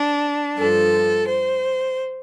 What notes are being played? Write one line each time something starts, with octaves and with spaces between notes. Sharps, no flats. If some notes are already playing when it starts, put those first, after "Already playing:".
Already playing: D4
G2 F3 A4
C5